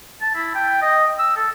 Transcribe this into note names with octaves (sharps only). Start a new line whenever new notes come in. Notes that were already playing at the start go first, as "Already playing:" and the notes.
A5
E4
G5
D#5
E6
A4